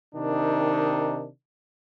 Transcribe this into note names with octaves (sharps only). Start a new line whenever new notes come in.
C3 D#3 D4 D#4 A#4